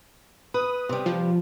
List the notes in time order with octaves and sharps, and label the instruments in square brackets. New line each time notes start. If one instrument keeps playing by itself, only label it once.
[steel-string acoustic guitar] B4 [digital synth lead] D#6
[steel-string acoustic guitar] C3 G3
[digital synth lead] F3